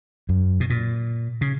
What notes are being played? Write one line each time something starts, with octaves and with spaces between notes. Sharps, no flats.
F#2
B2
A#2
C#3